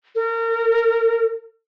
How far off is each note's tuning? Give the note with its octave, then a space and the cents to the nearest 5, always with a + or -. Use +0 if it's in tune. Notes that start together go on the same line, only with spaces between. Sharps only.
A#4 -30